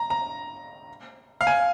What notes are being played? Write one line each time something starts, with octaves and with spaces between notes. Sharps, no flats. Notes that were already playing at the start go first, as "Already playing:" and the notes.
Already playing: A#5
A#5
F5
G#5